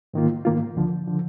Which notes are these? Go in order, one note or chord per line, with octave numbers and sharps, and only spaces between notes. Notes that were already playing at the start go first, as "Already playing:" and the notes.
G#2 D#3 A#3 F4
G#2 D#3 A#3 F4
D2 D3 F3
D3 F3